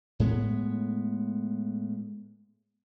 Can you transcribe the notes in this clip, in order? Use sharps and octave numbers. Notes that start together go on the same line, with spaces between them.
A2 G#3 B3